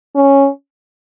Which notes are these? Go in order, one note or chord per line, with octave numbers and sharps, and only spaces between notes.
C#4